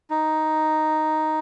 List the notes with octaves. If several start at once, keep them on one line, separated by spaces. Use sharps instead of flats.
D#4